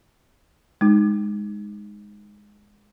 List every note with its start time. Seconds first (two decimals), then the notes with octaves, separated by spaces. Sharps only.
0.81 G#3 D#4